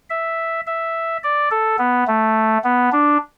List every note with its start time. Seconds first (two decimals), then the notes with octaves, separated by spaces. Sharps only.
0.10 E5
0.67 E5
1.23 D5
1.51 A4
1.79 B3
2.07 A3
2.64 B3
2.92 D4